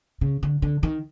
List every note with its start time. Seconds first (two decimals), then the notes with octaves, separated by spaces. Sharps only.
0.21 C#3
0.43 D3
0.62 D3
0.83 D#3